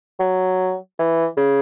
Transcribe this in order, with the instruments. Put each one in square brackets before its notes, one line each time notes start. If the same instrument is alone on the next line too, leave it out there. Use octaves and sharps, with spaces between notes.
[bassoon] F#3
E3
C#3